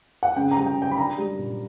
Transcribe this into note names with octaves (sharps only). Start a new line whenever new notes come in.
F#5
C#3 G5
A#5
G3
G5
C#3
G5
B5
D4 A#5
G3
A#2